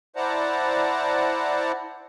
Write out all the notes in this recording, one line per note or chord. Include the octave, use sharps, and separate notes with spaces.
E4 C5 D5 F#5 A5 A#5